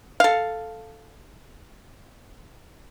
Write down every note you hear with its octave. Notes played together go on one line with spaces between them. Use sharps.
A4 F5